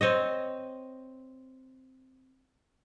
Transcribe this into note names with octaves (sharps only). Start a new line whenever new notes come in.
C4 C#5 D#5